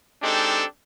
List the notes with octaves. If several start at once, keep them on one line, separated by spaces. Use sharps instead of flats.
G#3 C4 D4 D#4 G4 A4